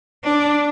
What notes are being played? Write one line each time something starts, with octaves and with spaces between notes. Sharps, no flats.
D4